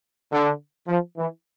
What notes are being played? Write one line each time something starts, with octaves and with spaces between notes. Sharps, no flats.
D3
F3
E3